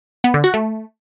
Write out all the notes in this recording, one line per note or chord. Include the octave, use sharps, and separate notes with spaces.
B3
D3
F#4
A3